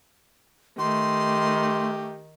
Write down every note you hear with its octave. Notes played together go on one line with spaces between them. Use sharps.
D#3 A3 G4 C6